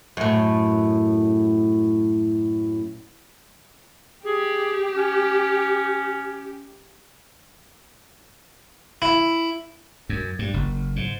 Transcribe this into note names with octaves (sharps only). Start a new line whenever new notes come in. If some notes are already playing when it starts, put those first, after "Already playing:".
F#2 A2
G4 G#4
C#4
E4
F#2
G2
F#1
G#2